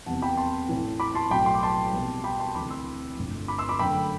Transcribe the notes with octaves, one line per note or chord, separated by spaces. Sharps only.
E2 C3 G3 B3 F#5 A5
G5 B5
A5 C6
A1 A2 E3 A3
B5 D6
A5 C6
B1 A2 F#3 A3 G5 B5
C6
D6
A5 C6
C2 B2 G3 B3
G5 B5
A5 C6
D2 C3 E3 B5 D6
C6 E6
G1 G2 D3 A3
B5 D6
C6 E6
B5 D6
F#2 D3 A3 G5 B5